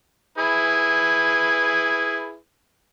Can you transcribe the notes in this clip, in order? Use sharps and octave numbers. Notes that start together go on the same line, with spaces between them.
E4 G#4 B4